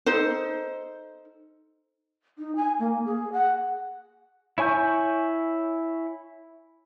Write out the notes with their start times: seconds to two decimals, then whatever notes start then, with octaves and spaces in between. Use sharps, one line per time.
0.06 D#4 A4 C5
2.38 D#4
2.56 G#5
2.79 A#3
3.05 G#4
3.33 F#5
4.58 E4 C#5 G#5 C#6 G6